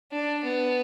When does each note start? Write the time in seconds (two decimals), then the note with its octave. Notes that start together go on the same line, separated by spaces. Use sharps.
0.12 D4
0.44 B3